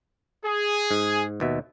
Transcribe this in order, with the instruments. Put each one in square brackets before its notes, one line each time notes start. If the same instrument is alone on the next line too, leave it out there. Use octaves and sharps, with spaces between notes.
[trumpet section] G#4
[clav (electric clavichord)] G#2
D#2 B2 E5